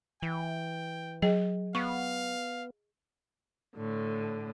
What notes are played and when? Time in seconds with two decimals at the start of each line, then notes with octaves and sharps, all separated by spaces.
0.23 E3 G5
1.22 F#3 G#4 D#5 G5
1.75 B3 F5 C#6
3.75 A2 D3